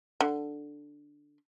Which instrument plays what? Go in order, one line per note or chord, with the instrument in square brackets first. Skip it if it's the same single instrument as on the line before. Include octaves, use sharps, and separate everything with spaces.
[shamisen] D3